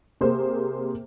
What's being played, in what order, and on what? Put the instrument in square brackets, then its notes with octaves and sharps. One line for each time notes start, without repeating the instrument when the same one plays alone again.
[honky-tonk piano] C3 A#3 G#4 C5